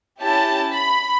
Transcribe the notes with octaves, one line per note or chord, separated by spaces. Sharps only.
C#4 E4 G4 A5
B5